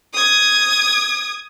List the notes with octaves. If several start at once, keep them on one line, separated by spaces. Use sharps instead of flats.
D#6 G#6